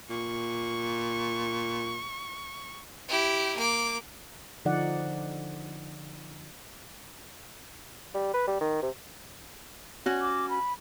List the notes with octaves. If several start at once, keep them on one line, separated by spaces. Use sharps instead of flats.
A#2 C#6
E4 G4
A#3 D6
D3 F3 D#4 D5 F#5
G3
B4
G3
D#3
C3
C#4 F#4
D6
B5